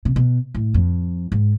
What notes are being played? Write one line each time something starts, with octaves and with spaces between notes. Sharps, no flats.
C3
B2
A2
F2
G#2